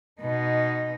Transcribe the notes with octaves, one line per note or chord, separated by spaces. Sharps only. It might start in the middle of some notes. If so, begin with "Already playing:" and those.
B2 D#4